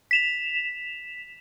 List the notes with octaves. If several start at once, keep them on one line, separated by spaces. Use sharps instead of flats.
B6 E7 F7